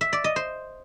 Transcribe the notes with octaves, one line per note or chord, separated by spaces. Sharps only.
E5
D5
D#5
C5